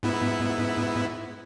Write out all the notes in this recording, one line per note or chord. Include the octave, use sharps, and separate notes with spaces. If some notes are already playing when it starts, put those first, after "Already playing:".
G#2 B3 E4